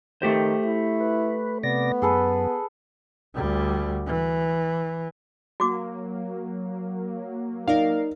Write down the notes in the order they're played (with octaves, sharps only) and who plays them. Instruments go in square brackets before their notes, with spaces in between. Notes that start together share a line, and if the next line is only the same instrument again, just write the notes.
[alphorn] D#3 [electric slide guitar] A3 G4 C5
[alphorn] E4
[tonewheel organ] B4
[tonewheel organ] C3 D5 A#6 [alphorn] B3
[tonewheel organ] F#2 [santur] G#4 A4 B4
[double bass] D2 G3
E3
[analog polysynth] F#3 A#3 [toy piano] F#4 D6
[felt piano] D#4 [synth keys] A#4 D5 F5